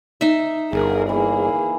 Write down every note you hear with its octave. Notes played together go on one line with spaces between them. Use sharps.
D#4 E5
G1 G#4 A#4
E3 A#3 G#4